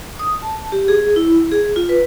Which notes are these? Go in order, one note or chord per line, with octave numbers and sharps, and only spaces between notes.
D#6
A5
G4
G#4
E4
G#4
F4
B4